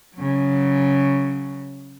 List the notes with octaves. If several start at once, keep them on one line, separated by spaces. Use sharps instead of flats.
C#3 F#3